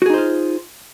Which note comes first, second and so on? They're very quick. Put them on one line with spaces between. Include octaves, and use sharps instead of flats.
F#4 G#4 D#4 C5 F4